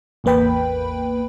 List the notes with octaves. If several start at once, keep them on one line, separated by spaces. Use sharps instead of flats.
A1 E2 A#3 B4 G5 B5